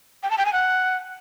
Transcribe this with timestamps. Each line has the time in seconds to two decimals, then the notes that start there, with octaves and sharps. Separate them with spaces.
0.23 G5
0.31 A5
0.38 G5
0.45 G#5
0.53 F#5